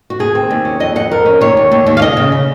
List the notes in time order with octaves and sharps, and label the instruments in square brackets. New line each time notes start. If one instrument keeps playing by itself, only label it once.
[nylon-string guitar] F#4
D#2 G#4
C4
D#2
C#4
F2 D#5
F2 F#5
F2 A#4
C#4
D#2 C#5
D#2
D#2
D#2
F5
C#3 D#5
C#3
C#3